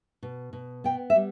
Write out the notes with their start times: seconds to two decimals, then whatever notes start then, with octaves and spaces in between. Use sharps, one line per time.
0.23 B2
0.53 B2
0.84 B3 G5
1.10 E5
1.16 G3